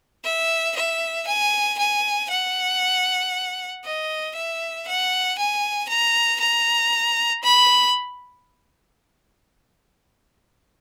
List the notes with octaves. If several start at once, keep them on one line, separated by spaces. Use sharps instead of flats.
E5
E5
G#5
G#5
F#5
D#5
E5
F#5
G#5
A#5
A#5
B5